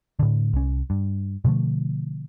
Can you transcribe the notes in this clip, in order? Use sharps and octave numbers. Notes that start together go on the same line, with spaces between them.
A2 D3
C2 C#4
G2
B2 D3 F3 A3